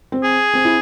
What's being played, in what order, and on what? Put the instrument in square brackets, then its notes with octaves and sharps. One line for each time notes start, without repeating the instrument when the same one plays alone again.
[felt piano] C4
[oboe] G#4
[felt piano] C4
E4